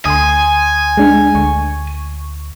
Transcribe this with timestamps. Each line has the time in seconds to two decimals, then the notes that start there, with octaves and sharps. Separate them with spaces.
0.05 D2 G#5 C6 D#6
0.97 G#3 D4
1.35 D2 C#6